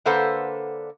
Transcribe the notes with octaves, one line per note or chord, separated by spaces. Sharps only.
D3 A#3 A4 B4 C5 F#5